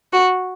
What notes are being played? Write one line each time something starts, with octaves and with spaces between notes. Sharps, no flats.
F#4